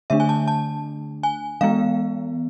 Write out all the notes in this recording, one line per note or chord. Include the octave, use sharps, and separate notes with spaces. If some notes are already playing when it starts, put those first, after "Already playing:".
D3 A3 D4 E5
G#5
A5
A5
G#5
E3 G#3 B3 F5